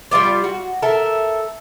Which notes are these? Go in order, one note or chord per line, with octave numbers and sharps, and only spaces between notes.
G3 G#3 F4 D5
F#4
A4 A#4 E5